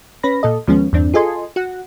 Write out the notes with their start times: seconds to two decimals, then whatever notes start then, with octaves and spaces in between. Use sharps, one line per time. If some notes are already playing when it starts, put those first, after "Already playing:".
0.23 C#4 B4 B5 A#6
0.43 A#2 A4 D#5
0.68 D#2 F3 G#3 B3 C#4
0.93 E2 G2 C4 D4
1.14 F4 G#4 A4 D#5 G#5 C6
1.56 F#4 F#5